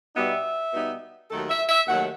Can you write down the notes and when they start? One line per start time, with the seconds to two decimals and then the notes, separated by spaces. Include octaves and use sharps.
0.14 B2 G3 B3 D#4 E5
0.73 B2 G3 B3 D#4
1.30 D#2 D#3 F#3 A3 A4
1.49 E5
1.69 E5
1.88 D#2 D#3 F#3 A3 F#5